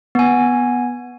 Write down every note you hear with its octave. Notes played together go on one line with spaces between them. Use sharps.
B3 G#5